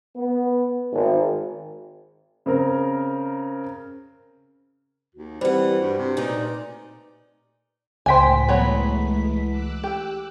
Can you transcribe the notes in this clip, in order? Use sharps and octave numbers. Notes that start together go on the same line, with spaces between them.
B3
G#1
C#3 C4 A#4
D#2 F#4
E3 G3 C4 G4 C5 F#5
G2 F#4
C3
A#2 A3 D#4 B4 D5
C#2 A2 C5 G5 G#5 B6
E3 F#3 G#3 A3 B3 C#5
D6 E6 F#6
G4